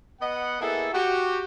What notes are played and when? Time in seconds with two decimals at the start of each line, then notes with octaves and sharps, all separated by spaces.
0.20 B3 D#5 F#5
0.61 A#3 B3 E4 G#4 A4
0.93 F#4 G4